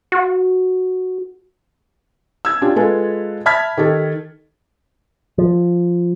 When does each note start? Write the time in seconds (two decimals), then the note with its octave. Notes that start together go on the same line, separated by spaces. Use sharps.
0.12 F#4
2.45 E6 G#6
2.61 C#4 D4 F4 G4
2.76 G#3 F4 A4 B4
3.46 E5 A5 B5 F6 G#6 B6
3.78 D#3 G4 A4
5.38 F3